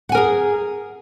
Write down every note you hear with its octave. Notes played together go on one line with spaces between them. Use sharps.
G#4 A#4 F#5 G#5